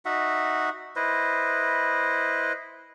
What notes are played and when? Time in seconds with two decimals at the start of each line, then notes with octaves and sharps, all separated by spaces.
0.05 D#4 F#4 E5 F#5
0.96 E4 B4 C5 D#5